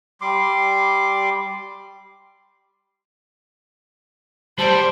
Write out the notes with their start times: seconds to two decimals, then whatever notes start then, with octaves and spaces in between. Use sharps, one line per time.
0.21 G3 C6 D6
4.59 G3 C5 D5 A5